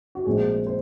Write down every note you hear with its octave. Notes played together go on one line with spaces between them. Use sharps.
F#4
A#1 A#2 G#3 C4 G#4
C5